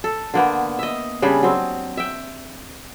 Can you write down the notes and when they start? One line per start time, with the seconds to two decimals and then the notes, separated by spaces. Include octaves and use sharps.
0.04 A4
0.34 D3 A#3 B3
0.79 D#5 E5
1.22 C#3 G3 D4 G#4
1.43 F#3 C4
1.97 E5 G5